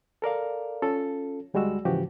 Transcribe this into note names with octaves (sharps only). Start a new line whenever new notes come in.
A4 A#4 D5 F5
C#4 F4 A4
D2 G3 G#3 F#4 E6
G#2 C#3 E3 F3 F#4 G4